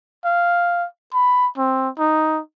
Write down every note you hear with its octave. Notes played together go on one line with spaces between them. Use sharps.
F5
B5
C4
D#4